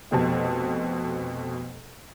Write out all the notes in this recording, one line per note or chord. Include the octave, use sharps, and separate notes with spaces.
F1 F2 B2 A5